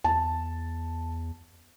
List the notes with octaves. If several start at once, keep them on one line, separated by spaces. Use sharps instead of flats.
E2 A5